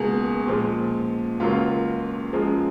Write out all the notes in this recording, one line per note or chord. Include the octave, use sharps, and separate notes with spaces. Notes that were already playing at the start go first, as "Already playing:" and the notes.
Already playing: C#2 B2 A#3 G#4
A#2 F3 G#3
C#2 C#3 F#3 A#3 F4
F#2 F3 G#3